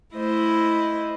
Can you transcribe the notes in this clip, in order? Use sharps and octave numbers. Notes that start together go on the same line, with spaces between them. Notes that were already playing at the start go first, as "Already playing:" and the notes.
A3 E4 C5 D#5